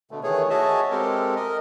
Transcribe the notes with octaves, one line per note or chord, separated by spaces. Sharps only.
B2 D3 A3
D#3 E3 A3 G#4 C#5
F#4 G#4 C#5 D#5 E5 A5
G#3 C4 G4 A4 A#4
A#4 D#5